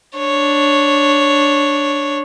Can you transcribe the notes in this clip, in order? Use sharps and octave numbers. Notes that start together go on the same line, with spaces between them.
D4 C#5